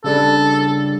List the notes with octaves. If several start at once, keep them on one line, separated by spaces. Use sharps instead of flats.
C#3 G3 D4 A4